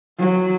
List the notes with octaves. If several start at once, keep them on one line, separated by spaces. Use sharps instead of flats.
F#3